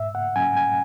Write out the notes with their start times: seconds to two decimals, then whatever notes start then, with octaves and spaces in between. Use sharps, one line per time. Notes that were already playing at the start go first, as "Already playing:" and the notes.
Already playing: G#2 E5
0.15 F#5
0.36 F#3 C#4 G#5
0.57 G#5